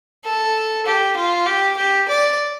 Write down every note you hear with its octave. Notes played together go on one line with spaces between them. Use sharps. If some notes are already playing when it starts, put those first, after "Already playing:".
A4
G4
F4
G4
G4
D5